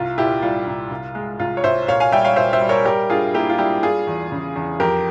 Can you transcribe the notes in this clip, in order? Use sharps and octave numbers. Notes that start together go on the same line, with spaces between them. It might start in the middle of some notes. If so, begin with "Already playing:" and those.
Already playing: C2 F4
A#2 E4 G4
G3 F4
C2
C2
G#3
C2 F4
C#5
C2 C5 E5
A#2 C#5 F5
F5 G#5
G3 E5 G5
C#5 F5
A#2 C5 E5
C5 E5
G3
A#4 C#5
G3 G4 A#4
G2 F4 G#4
A#3 E4 G4
F4
G3 E4 G4
G3 F4 G#4
E2
C#3
E2
F2 G4 A#4